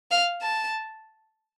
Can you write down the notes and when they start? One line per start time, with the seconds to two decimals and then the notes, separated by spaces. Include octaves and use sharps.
0.11 F5
0.41 A5